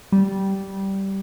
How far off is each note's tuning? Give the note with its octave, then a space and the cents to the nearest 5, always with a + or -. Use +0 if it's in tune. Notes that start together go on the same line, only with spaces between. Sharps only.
G3 -10